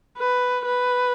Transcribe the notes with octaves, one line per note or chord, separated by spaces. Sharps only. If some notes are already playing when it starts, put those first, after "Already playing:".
B4
B4